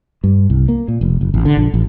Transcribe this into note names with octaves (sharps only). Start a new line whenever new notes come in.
G2
C2
A#3
A#2
F1
F#1
A1
D3
A#1
A1